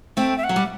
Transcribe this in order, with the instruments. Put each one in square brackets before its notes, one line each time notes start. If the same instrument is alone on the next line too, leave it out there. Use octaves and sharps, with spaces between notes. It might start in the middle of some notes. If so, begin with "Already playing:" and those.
[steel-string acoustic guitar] A3 C4 [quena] G5
[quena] E5
F#5
[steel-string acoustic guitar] F#3
G3